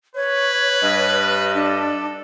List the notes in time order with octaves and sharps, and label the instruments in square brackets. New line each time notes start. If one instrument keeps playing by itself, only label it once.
[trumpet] B4 [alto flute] C#5
[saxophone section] G2 D#5
[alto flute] D4 [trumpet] A4